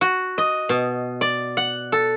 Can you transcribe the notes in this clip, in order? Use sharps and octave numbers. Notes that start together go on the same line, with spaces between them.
F#4
D#5
B2
D5
F#5
A4